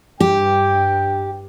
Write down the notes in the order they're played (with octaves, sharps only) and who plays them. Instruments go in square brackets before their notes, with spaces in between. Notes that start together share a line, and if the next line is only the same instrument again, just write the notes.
[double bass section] G2 [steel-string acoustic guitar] G4 [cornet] G5